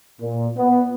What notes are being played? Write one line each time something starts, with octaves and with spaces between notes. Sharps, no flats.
A#2
B3